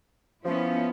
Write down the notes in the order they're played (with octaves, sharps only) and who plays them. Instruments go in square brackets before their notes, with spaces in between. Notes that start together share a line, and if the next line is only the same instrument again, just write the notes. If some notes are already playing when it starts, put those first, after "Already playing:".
[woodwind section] F3 [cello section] B3 C#4 E4